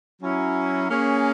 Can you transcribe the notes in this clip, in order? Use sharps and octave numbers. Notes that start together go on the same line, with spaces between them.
F#3 C#4 E4
A#3 C#4 G#4